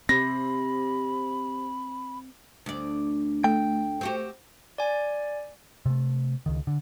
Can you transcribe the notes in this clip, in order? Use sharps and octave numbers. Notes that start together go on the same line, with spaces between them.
C3 C4 B5 A#6
D2 D5
A3 G5
C4 F#4 G4
D5 G#5
C3 A3
C#2 D#3
D3